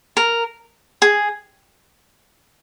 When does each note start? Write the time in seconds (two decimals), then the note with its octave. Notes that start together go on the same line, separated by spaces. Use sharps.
0.17 A#4
1.02 G#4